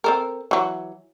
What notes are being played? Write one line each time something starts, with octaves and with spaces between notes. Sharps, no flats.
C4 A4 A#4
E3 F#3